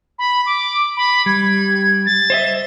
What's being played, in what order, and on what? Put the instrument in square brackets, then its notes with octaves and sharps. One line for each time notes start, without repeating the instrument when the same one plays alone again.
[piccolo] B5
D6
B5
[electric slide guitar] G3 [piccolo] G#6
[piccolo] A6
[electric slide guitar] C5 D#5 E5